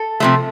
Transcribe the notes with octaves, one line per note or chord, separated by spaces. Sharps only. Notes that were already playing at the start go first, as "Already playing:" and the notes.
Already playing: A4
C3 F3 A3